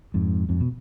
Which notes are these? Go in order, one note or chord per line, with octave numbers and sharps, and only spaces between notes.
F2 G#2
F2 G#2
B2